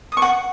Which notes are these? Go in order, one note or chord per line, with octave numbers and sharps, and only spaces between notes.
D#6
C#6
F#5